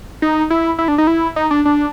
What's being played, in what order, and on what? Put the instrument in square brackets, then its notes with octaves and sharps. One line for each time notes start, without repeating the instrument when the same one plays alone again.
[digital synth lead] D#4
E4
E4
D4
D#4
E4
D#4
D4
D4